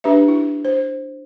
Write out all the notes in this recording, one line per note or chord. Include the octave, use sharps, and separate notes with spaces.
D4 G4 B4 E5
E4
C5